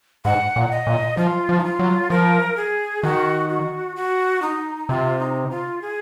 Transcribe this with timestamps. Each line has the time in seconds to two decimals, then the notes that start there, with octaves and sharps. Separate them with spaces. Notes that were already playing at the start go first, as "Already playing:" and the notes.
0.25 G#2 F#5
0.56 A#2
0.71 D#5
0.87 A#2
1.17 F3 F4
1.49 F3
1.59 D#4
1.64 F4
1.79 F#3
2.10 F3 A#4
2.57 G#4
3.03 D#3 F#4
3.49 F#4
3.96 F#4
4.42 D#4
4.89 C3 F4
5.20 D#4
5.51 F4
5.82 G#4